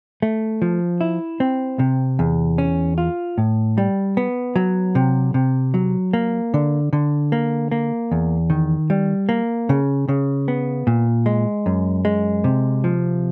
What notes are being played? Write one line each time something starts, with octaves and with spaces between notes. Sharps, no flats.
A3
F3
E4
C4
C3
E2
C#4
F4
A2
G3
B3
F#3
C3
C3
F#3
A#3
D3
D3
A#3
A#3
E2
D#3
G3
A#3
C#3
C#3
B3
A#2
G#3
F#2
G#3
C3
F3